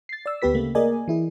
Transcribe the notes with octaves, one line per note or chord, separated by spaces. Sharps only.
A6 C7
D5 E6
D2 B3 G4 B4 B6
C#3 A3 A#3
A#3 G#4 A#4 D5 D#5 G#5
E3 E4 G#4